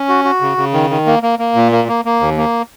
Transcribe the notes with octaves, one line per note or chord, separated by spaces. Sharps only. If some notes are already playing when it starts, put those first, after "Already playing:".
Already playing: C#4
F#4
F#4
C#3
C#3
D#3
D#3
A#3
A#3
A#3
A#2
A#3
A#3
A#3
D#2
A#3